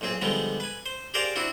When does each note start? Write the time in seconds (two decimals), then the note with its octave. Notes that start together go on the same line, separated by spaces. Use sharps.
0.01 B1 A#2 C4 G#4
0.21 D3 F3 G3 G#3 B3
0.60 B4 G#5
0.86 C5
1.14 G4 G#4 A#4 C5 D5 F5
1.36 C4 D4 E4 F#4